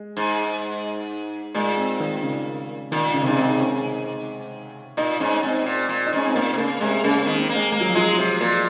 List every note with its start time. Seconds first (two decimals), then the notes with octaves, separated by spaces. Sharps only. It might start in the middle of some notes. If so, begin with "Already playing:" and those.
Already playing: G#3
0.17 G#2
1.55 A#2 G#3
1.77 C4
2.00 D#3
2.23 C#3
2.92 A#2 D#3
3.14 C#3
3.22 C3
3.26 G#2 C#3
3.37 C4
3.60 C#4
4.97 A#2 D#4
5.20 G#2 C#4
5.43 G#2 C4
5.66 A#2
5.89 A#2
6.07 D#4
6.12 G#2 C#4
6.25 C4
6.35 A#2 A#3
6.53 C3
6.58 C#3 A#3
6.80 C3 G#3
7.04 C#3 A#3
7.21 C4
7.26 D#3
7.38 A#3
7.49 A#3
7.55 G#3
7.72 G#3 A#3
7.81 F#3
7.89 F3
7.95 F#3 G#3
8.18 C3
8.41 A#2 A#3